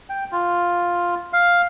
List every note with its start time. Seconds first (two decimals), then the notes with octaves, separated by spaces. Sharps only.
0.09 G5
0.32 F4
1.33 F5